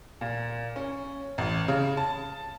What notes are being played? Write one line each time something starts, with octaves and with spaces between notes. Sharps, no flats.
A#2
C#4
A1
C#3
A5